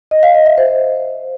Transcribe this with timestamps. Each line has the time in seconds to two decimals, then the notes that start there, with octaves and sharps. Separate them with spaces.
0.11 D#5
0.23 F5
0.34 D#5
0.46 E5
0.58 C5